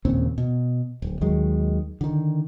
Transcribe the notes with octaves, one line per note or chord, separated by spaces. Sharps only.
D#2 A#2 C#3 C4
B2
D1
D#2 D#3 F#3 G#3
D3 D#3